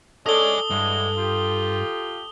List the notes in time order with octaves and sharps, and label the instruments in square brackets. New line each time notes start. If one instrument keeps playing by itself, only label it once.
[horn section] C#4 D4 D5 [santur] A4 [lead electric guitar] D#5 G#5 [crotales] D#6 G7
[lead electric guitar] G2 [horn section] D3 E3 G#3
[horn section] F4 G4